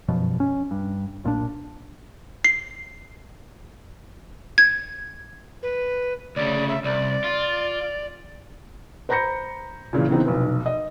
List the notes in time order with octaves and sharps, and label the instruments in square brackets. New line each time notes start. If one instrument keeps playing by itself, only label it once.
[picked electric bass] G1 F#2 B2 F3
C#4
G2
B1 A#2 E3 D4
[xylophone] C7
G#6
[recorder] B4
[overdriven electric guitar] D2 C#3 [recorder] D5
[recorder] E5
[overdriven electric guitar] C2 [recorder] D5
[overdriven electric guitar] F4
[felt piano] C5 A#5 B5 G6 A#6 C#7
A#2 C#3 E3
C#3 E3 B3 C4 D#4
F1 B1
D#5